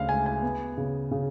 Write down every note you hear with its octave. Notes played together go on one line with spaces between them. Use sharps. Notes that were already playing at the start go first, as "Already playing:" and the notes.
Already playing: D2 C#3 F5
G#3 G#5
G#5
B3
C#3
C#3